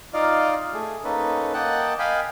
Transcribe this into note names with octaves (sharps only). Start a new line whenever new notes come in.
D#4 F4 D5 D#5 F5
A3 G#4
A#3 C#4 D#4 A4 B4
A#3 D#5 F#5 G5 A5 F#6
D#5 F5 G5 G#5 B5